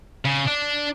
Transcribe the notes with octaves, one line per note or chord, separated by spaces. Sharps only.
C#3
D4